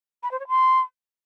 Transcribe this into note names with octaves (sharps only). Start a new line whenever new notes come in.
B5
C5
C#5
C6